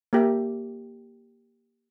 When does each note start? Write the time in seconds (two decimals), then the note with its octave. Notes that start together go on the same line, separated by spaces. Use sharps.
0.13 A#3 G4 E5